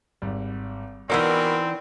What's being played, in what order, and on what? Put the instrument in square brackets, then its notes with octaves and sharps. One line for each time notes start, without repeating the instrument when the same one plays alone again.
[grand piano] G#1 G3
[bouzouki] E3 D#4 D5 [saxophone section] B3 F#4 A#4 [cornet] C4 [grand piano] E6